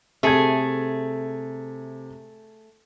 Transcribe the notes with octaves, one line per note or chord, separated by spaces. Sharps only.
C3 A3 G#4 G#6